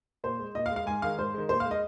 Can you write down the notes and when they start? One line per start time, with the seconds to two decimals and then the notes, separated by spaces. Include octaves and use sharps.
0.24 A#2 C5
0.39 G#3
0.55 A#2 D#5
0.66 F5
0.71 G#3
0.76 F5
0.86 G#2 G#5
1.02 D#3 G#3 F5
1.18 G#2 C5
1.34 D#3 G#3
1.49 A#2 C5
1.60 F5
1.65 G#3
1.71 D#5